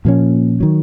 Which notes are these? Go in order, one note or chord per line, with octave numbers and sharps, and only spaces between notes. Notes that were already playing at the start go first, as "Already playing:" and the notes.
A#2 F3 A#3 C#4
D#3 F#3